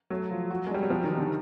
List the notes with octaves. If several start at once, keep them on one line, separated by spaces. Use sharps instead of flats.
F#3 A3
F3
F#4
G#3
G3 D4
F#3
F3 F#4
D#3
D#4
D3